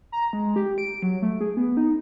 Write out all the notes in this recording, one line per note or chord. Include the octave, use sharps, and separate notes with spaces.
A#5
G#3
G4
D7
F#3
A3
G#4
B3
D#4